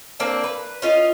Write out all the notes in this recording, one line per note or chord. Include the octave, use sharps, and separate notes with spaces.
A#3 C4 D4
B4
C#4 F4 D#5